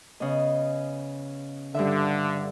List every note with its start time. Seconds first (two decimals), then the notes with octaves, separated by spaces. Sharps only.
0.20 C#3 B3 D#5
1.74 G2 D3 E5